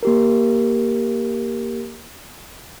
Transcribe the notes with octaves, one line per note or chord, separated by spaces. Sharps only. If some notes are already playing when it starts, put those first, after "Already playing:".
A#3 G4 A#4